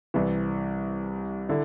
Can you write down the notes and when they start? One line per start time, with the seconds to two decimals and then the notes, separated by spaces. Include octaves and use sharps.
0.14 C2 C3 E3
1.49 D3 E4